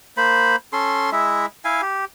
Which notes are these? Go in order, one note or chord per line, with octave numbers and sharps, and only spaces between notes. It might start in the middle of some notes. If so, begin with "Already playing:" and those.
A#3 C5 B5
C#4 A4 C6
G#3 E4 E5
E4 F5 G#5
G4